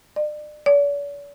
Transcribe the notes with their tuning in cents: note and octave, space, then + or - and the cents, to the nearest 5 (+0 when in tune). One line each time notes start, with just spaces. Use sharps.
D5 +35
D5 -45